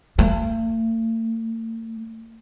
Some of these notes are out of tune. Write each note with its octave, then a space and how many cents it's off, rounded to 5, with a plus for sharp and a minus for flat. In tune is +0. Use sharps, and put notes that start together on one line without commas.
A3 +45